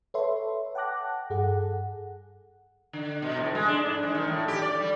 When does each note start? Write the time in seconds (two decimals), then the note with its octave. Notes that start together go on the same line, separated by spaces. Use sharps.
0.14 A4 B4 C#5 E5 C6
0.75 F#5 G5 A5 D6 F#6 A#6
1.30 G2 G#4 A4 F#5
2.93 D3
3.22 B2
3.37 A2
3.55 G#3
3.68 D4
3.86 G#2
4.03 G#3
4.14 D#3
4.27 A2
4.48 G4
4.62 D5
4.80 G3